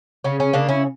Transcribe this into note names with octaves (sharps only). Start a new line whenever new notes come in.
C#3 C#4
C#4
C#3 A#3 D4
C#4 E4